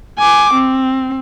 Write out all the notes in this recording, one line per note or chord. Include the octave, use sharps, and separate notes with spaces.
G#5 D6
C4